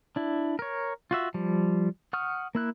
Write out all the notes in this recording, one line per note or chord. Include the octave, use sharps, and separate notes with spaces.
D4 E4
A#4 C#5
F4 F#4 E5
F3 G3
F#5 C#6 D#6 F6
A#3 E4 F#6